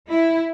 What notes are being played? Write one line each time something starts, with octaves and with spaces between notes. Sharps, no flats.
E4